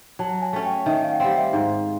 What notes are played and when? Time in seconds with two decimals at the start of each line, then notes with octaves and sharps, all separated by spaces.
0.19 F#3 A5
0.42 G#5
0.53 A3 C#4
0.65 G5
0.86 D#3 E5
1.03 F5
1.13 F#5
1.20 G3 C4 F5
1.36 E5
1.53 G#2 F5